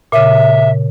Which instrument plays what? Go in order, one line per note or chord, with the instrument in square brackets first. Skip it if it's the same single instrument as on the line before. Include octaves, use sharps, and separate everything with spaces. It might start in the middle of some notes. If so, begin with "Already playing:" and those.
[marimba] A#2 C#3 [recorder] E5